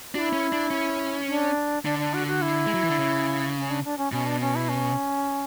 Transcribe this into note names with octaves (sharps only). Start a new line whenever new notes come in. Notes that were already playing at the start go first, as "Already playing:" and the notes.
D4 E4 F#4
C#4
D4
C#4
D4
D3 D4
D4
F#4
F#4
E4
G#3
F#3
E3
D3
C#3
C#4
D4
D4
C#4
B2 C#4
D4
C#4
E4
C#4